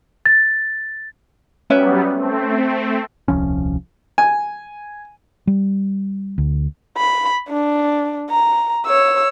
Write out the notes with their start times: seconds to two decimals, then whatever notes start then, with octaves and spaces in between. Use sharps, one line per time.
0.26 A6
1.70 F#3 G3 B3 C#4 B4 E5
2.15 A3 C4
3.28 D#1 C2 F3 C#4
4.18 G#5
5.47 G3
6.38 D2
6.97 B5
7.49 D4
8.30 A#5
8.86 C#5 E6